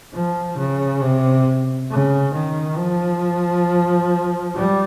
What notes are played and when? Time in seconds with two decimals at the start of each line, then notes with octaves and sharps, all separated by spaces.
0.14 F3
0.58 C#3
1.01 C3
1.90 C#3
2.34 D#3
2.77 F3
4.55 G3